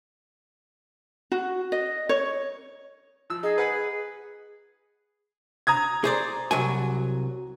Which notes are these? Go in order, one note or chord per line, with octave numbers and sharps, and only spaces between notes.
F#4
D#5
C#5
F3 E6
D#4 G#4
B4 F#5 G#5
A#5 D#6 G#6
G#4 C5 D5
C2 F#3 G#5